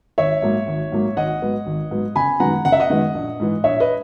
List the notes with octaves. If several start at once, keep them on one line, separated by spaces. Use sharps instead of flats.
G#1 C#5 E5
G#2 F#3 A#3
G#1
G#2 F#3 A#3
G#1 D#5 F#5
G#2 F#3 B3
G#1
G#2 F#3 B3
F#1 G#5 B5
F#2 D#3 G#3 B3 F#5 A#5
F#1 F#5
E5
D#5 F#5
F#2 D#3 G#3 B3
A#1
G#2 E3
A#1 C#5 E5
B4 D#5